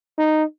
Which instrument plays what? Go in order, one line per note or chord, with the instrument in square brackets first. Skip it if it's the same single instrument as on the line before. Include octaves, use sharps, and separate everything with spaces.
[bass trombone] D#4